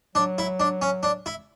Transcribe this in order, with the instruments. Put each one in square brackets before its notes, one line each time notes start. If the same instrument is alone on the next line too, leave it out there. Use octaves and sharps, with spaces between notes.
[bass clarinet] F#3 [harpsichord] D4
[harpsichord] E4
D4
C#4
D4
E4